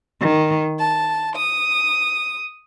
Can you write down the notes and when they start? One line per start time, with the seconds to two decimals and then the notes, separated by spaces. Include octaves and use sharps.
0.20 D#3
0.79 A5
1.36 D#6